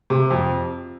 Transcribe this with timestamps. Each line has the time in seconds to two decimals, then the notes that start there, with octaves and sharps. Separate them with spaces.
0.10 C3
0.31 F2